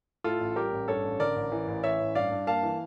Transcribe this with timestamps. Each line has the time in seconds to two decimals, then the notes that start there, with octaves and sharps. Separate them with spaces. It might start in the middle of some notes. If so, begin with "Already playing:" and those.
0.24 A2 F4 A4
0.40 A1
0.56 G3 G4 A#4
0.72 A1
0.88 G2 A4 C#5
1.04 A1
1.20 D3 A#4 D5
1.36 A1
1.52 E3
1.68 A1
1.83 E3 C#5 E5
2.00 A1
2.15 G2 D5 F5
2.31 G2
2.47 A#3 F5 A5
2.63 E3